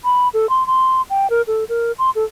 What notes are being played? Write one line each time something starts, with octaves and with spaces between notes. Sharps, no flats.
B5
A4
C6
C6
G5
A#4
A4
A#4
C6
A4